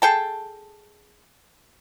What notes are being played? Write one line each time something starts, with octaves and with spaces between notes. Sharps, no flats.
G#4 A4 G5 A5